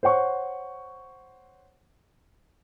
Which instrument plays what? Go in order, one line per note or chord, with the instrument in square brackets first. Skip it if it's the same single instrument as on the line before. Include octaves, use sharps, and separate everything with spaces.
[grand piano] C5 C#5 F#5 C#6